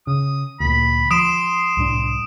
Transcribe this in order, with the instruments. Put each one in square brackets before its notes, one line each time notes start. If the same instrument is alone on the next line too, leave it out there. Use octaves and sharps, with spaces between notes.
[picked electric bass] C#3 [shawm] D#6
[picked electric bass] D2 A#2 [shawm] B5
[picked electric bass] F3 [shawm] C6 [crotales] D#6 D7 E7
[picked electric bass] C2 A2 D4